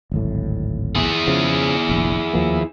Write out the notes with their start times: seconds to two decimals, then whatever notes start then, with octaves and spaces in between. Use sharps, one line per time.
0.12 D1 G#1 A2
0.95 E4 G#4
1.27 C#3 F3
1.89 F1 A#1
2.33 D#2 F3 A#3